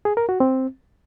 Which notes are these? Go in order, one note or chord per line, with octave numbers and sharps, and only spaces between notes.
G#4
A#4
F#4
C4